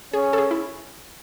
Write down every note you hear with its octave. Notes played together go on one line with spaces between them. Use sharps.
C#4 G#4
A4
G#4
E4